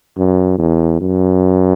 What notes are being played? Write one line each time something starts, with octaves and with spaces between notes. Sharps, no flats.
F#2
E2
F#2